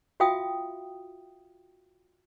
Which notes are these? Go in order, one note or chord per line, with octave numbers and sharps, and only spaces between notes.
F4 F#4 E5 F5 G5 D#6